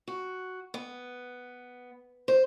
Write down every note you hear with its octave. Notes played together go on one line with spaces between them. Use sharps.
F#4
B3
C5